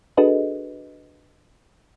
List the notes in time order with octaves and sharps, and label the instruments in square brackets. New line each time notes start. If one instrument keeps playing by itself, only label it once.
[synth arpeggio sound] D4 F#4 G#4 A4 B4 D#5